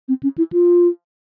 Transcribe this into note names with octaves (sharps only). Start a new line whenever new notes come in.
C4
C#4
E4
F4